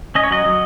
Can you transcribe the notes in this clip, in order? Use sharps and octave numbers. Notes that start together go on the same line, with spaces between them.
C#4 D#5
C#5
F#3 D#5
F#3